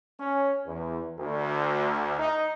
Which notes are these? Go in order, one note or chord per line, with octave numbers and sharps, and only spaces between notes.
C#4
E2
D2
D#4